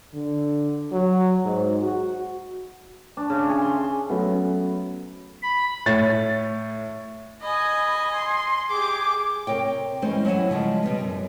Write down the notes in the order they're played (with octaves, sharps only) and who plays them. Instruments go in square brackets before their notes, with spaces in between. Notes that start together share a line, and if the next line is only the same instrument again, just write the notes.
[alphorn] D3
F#3
G#2
F#4
[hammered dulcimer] D4
C#3
G#4
C6
[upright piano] F#3 A3 B3 C#4
[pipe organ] B5
[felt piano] A2 C#5 A6
[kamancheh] D#5 G#5 [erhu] B5
[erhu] C6
[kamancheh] G4 G#4 [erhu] D6
[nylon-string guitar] C3 A#4 C#5 G5
E3 G3 G#3 C#4 C5
F#3 E4 D#5 F#5 G#5
C#3 F3 G3 G#3
B2 G3 B3 B4
F#2